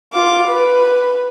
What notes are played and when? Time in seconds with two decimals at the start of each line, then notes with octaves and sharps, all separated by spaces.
0.13 F4 D6
0.48 B4